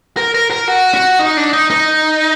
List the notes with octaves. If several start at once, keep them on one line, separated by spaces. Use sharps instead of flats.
A#4
A#4
A#4
F#4
F#4
D#4
D4
D#4
D#4